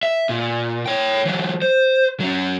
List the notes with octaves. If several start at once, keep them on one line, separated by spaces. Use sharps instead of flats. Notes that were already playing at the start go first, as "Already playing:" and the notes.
E5
A#2
C#5 G5
E3 F#3
C5
F#3 C#4